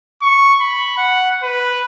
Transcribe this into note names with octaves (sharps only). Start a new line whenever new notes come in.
C#6
B5
F#5
B4